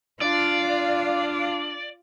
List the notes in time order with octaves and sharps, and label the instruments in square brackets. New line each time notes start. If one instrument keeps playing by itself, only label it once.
[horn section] D4 [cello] F4 F5 [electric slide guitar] D5